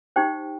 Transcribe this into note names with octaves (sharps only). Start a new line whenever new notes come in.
D#4 G4 C5 G5